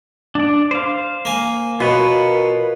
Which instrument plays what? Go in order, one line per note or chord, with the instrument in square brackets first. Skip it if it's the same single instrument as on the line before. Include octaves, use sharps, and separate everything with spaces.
[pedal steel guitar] D4 D5
C5 F5
[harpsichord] A#3 G#5
[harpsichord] B2 [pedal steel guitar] F4 B4 C#5 [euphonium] A#4